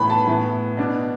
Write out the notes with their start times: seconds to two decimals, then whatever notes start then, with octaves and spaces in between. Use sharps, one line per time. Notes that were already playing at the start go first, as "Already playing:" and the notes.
Already playing: A2 E3 B3 E4 B5
0.10 A5
0.26 A2 E3 B3 E4
0.77 B2 B3 D4